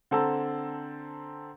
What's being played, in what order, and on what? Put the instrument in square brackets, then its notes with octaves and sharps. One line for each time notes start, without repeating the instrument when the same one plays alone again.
[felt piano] D3 C4 A4 A5 A#5 E6